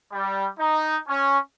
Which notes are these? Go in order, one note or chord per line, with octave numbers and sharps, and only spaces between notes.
G3
D#4
C#4